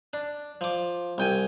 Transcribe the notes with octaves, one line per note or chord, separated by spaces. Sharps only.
D4
F3 D6
C2 G5 G#5